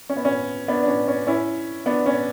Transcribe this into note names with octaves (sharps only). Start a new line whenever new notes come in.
C#4
B3
C#4
B3 D4
D4
C#4
C#4
C#4 E4
B3 D4
C#4